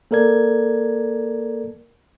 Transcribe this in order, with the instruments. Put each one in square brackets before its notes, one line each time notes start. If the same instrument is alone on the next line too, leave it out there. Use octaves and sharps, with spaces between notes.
[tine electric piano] A#3 A4 A#4 D5 G#6